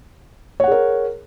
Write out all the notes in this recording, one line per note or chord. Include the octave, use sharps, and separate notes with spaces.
G#4 A#4 C#5 F#5